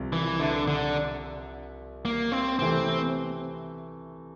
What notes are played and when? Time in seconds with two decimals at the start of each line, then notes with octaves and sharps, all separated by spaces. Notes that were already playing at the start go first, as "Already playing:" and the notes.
Already playing: C2 C3 F3
0.13 E3
0.40 D3
0.68 D3
2.05 A#3
2.32 C4
2.59 C3 E3 A3 C4